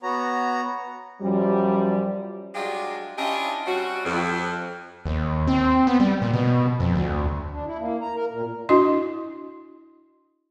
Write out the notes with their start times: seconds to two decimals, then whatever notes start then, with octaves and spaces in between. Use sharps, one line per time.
0.03 B3 F#4 C#5 A#5
1.21 F#2 F3 G3
2.54 F#3 G#3 D4 F4 G4
3.17 C#4 D4 E4 F4 G4 D#5
3.66 G3 C4 C#4 F#4
4.05 F2
5.06 D#2
5.47 C4
5.87 B3
6.00 G3
6.22 A#2
6.34 B2
6.80 F2
6.95 D2
7.51 D4
7.65 E4
7.79 A#3
8.02 A#5
8.16 A#4
8.31 A#2
8.69 D4 E4 F#4 D#5 C6